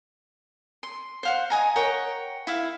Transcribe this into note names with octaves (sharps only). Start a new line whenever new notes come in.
C6
C5 F5 F#5
D#5 G#5 A#5
A#4 C#5 F#5 G5
E4 E5 F5